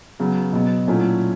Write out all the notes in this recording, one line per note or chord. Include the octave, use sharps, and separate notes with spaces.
C#3 F#3 B3
B2 F#3 B3
A#2 F#3 A3 C#4 E4